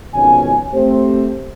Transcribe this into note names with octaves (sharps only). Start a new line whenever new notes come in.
G#1 F2 B2 C#4 G#5
A3 C4 G4 C5